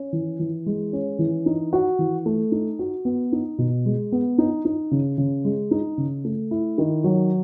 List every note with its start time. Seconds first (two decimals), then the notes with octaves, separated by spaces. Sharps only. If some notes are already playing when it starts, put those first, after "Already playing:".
Already playing: C#4
0.13 E3
0.40 E3
0.66 G#3
0.93 C#4
1.19 E3
1.46 D#4
1.73 F#4
1.99 E3
2.26 A3
2.52 D#4
2.79 F#4
3.05 B3
3.32 D#4
3.58 B2
3.85 G#3
4.12 B3
4.38 D#4
4.65 D#4
4.91 C#3
5.18 C#3
5.45 G#3
5.71 D#4
5.98 C#3
6.25 A3
6.51 E4
6.78 D#3
7.04 F#3